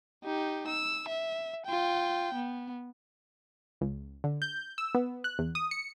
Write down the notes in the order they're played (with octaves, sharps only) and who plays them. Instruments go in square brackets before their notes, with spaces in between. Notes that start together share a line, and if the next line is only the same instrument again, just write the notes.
[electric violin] D#4 G4
E6
E5
F4 G5
B3
[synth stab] C#2
D3
G6
E6
B3
F#6
E2
D#6
C#7